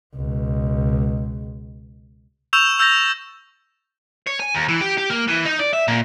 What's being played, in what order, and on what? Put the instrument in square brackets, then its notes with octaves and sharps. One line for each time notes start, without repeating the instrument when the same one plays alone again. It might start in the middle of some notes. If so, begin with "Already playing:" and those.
[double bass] C#2 B2
[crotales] C#6 E6 G6 E7 F7
E6 G6 A6 A#6
[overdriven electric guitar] C#5
G#5
D#2
E3
G4
G4
A#3
E3
D#4
D5
E5
A#2